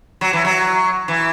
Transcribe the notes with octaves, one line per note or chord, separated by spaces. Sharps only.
F#3
E3
F#3
E3